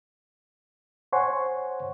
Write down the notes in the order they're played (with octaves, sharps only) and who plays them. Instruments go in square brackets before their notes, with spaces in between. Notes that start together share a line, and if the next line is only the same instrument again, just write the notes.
[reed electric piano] C5 C#5 F#5 G#5 C6 C#6